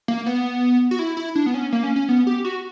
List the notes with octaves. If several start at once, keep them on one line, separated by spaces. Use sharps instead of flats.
A#3
B3
F#4
E4
E4
D4
B3
C#4
A#3
C#4
C#4
B3
G4
F#4